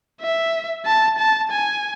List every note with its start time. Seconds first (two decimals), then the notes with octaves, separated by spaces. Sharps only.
0.21 E5
0.86 A5
1.19 A5
1.51 G#5